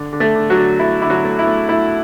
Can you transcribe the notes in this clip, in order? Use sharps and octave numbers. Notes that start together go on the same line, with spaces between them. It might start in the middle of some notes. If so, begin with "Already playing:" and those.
Already playing: D3
D3
A3 A4
D3
F#3 F#4
D3
A3 E4
D3 E4
F#3 F#4
A3
E4
A3
A3 E4